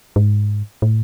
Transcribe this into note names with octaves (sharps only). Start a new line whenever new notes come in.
G#2
A2